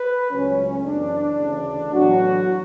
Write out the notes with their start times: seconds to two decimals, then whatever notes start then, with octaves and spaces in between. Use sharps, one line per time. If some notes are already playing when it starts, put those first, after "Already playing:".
Already playing: B4
0.31 C#2 C#3 F#3 A3 C#4
0.85 F#2 C#3 E3 B3 D4
1.40 D2 C#3 E3 A3
1.94 A2 E3 F#3 B3 F#4